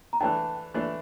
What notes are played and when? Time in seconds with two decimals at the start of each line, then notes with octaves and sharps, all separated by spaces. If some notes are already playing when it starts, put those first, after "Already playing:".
0.13 A#5
0.20 E3 A3 D4 G5 A5
0.74 E3 A3 D4